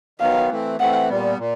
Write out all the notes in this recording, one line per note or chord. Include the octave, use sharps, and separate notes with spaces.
D#3 F#3 B3 F5
E3 A3 C4
E3 A3 C4 F#5
A#2 G3 B3
A#2